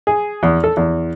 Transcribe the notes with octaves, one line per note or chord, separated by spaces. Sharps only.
G#4
E2
A4
E2